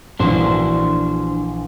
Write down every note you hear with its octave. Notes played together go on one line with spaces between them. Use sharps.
A#1 E3 D4 F#4 C5